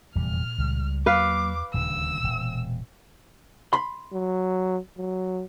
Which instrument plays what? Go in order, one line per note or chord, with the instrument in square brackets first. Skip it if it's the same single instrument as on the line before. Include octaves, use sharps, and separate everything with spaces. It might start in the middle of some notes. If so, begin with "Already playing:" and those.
[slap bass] F1 E2 G3 [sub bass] A#2 [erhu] F6
[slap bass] C#2 G3
[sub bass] E2 [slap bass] F#3 A#3 [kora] B4 F5 [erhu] D6
[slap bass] D#1 D2 C#3 [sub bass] A#2 [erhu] E6
[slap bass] E1
[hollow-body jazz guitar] B5 C6
[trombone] F#3
F#3